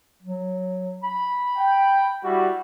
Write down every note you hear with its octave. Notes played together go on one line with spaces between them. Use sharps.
F#3
B5
G5
G3 E4 F#4